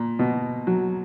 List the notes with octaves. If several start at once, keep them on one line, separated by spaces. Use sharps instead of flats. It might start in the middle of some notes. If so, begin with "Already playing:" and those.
Already playing: A#2
B2
F#3